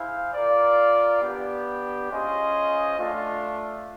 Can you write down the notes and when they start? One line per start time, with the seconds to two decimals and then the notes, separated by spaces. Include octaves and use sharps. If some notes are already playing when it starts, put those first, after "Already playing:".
Already playing: E4 G#4 C5 F5
0.33 F4 A#4 D5
1.21 B3 D4 G4
2.10 C#4 F4 G#4 C5 D#5
2.98 A3 D4 F4